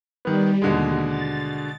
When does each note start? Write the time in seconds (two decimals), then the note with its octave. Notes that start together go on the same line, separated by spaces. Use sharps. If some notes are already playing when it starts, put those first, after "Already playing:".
0.25 D#3 G3 B3
0.62 D#2 B2 D3 G#3
1.07 A6